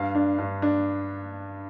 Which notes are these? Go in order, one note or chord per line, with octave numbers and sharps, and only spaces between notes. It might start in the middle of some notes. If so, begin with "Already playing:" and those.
Already playing: G2 F5
D4
G2
D4